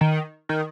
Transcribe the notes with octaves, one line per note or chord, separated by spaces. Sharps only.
D#3
D#3